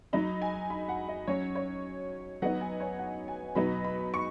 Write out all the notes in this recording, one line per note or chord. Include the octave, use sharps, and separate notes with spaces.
F#3 D#4 B5
G#5
B5
F#5
D#5
F#3 C#4 C#5
C#5
F#3 B3 D#4 F#5
G#5
C#5
F#5
G#5
B2 F#3 B3 D#4 B5
B5
C#6